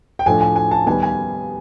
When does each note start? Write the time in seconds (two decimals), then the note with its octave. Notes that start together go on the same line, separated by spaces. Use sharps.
0.19 G5
0.26 A2 F3 A3 D4 G#5
0.41 G#5
0.56 G#5
0.71 A5
0.86 D#3 G3 B3 G#5
1.03 G#5